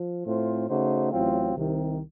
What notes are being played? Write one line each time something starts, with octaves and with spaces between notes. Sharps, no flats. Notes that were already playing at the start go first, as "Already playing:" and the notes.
Already playing: F3
A2 A3 C4 F4 C5
C#3 A3 D#4 F#4 C5
A1 A2 F#3 C4 F4
C2 C3 D#3